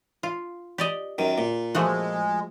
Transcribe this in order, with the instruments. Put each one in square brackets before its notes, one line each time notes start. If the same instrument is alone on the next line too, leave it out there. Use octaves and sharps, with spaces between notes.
[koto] F4
G4 D5 D#5
[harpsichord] F#2 D#3
A#2
[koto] F3 A3 F#4 [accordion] G#3